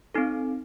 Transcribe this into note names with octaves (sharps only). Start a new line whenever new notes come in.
C4 D#4 A4